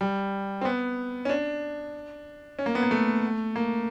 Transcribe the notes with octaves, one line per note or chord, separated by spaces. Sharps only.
G3
C4
B3
C#4
D4
C#4
A#3
B3
A#3
A3
A#3